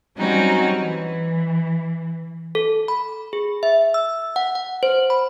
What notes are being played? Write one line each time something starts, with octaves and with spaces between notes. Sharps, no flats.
F#3 G3 C4 C#4 D#4 F#4
E3
A4
B5
G#4
E5
E6
F#5
F#5
C5
B5